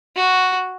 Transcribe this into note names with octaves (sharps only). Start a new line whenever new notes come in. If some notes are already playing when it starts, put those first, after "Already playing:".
F#4